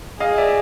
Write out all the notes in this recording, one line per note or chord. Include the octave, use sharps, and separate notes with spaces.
G#4 D#5 F5
D5 E5